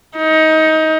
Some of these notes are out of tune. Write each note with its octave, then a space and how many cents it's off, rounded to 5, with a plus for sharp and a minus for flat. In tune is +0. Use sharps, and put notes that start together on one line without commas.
D#4 +20